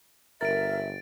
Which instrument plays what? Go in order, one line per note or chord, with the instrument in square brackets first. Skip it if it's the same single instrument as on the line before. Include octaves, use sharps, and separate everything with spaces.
[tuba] G1 [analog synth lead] A#4 [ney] E5 [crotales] A6 D7